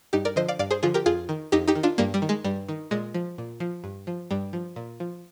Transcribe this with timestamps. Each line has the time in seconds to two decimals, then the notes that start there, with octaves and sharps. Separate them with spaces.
0.13 G2 D#4 G4
0.25 A#4 D5
0.36 D3 F3 C5 D#5
0.48 D5 F5
0.59 G2 D5 F5
0.71 G#4 C5
0.83 D3 F3 F4 G#4
0.94 G4 A#4
1.06 F2 F4 G#4
1.29 D#3
1.52 F2 D#4 G4
1.68 D#4 G4
1.75 D#3
1.83 D4 F4
1.98 G2 G3 A#3
2.14 G3
2.22 D#3
2.29 G#3
2.44 G2 G3
2.69 D#3
2.91 A#2 G#3
3.14 F3
3.38 A#2
3.60 F3
3.84 G2
4.07 F3
4.31 G2 G3
4.53 F3
4.76 A#2
5.00 F3